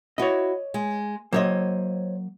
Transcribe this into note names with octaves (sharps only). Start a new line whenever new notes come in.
E4 F#4 C#5 D#5
G#3
F#3 A#3 C5 C#5 D#5